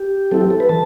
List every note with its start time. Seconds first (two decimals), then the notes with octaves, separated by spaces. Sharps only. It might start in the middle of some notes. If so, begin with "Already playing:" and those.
Already playing: G4
0.31 F#3 C4 E4 A4
0.41 G4
0.50 A4
0.60 B4
0.69 E3 A5